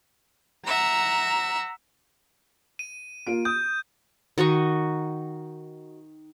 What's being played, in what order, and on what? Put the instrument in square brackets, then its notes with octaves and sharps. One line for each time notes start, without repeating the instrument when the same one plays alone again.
[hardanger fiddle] E5 F#5 [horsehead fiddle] A#5
[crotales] D#7
[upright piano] A#3 F4 D7
[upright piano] D#6 [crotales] G6
[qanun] D#3 F#4 D#5 C#6